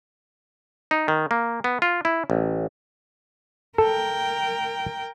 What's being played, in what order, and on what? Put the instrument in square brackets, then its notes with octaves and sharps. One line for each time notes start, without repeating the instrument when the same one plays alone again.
[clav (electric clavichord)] D#4
D#3
A#3
B3
F4
E4
A1
[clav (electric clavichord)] A4 [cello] A#4 G5